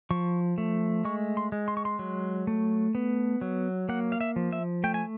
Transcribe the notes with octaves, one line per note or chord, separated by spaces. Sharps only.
F3 C#6
A3
G#3 C#6
C6
G#3
C6
C#6
C6
F#3
A3
B3
F#3
A#3 F#5
F5
E5
F3
E5
A3 G5
G#5